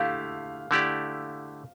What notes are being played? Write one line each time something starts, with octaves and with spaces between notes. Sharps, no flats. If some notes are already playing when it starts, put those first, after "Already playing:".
Already playing: D3 A3 E4 G4 F5
D3 A3 E4 G4 D5